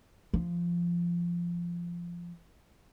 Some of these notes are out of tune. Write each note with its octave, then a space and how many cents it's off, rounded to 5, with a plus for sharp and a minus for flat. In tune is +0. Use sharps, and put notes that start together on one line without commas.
F3 -15